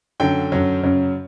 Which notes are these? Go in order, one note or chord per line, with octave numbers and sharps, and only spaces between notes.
F#2 D3 F#3 G5
F#2 D3 F#3
F#2 C#3 F#3